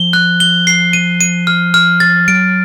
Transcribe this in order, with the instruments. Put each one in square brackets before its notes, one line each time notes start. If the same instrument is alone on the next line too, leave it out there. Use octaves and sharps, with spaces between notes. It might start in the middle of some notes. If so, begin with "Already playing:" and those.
Already playing: [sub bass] F3 [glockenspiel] G7
[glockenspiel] F#6
G7
C7
D#7
D#7
F6
F6
A6
[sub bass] F#3 [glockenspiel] D7